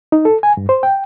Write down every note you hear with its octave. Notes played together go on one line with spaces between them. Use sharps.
D#4
A4
G#5
G2
C5
G5